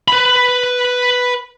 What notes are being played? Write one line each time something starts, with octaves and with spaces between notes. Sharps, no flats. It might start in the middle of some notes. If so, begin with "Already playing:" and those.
B4 B5